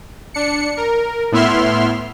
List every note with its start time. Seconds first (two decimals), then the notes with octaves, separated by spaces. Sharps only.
0.34 D4 C#7
0.77 A#4
1.32 A2 B3 E4 E5 C6 F6